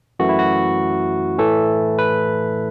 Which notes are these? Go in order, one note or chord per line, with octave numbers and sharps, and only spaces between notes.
F#2 E3 A3 F#4
E4
F#4
A2 E3 A3 A4
B4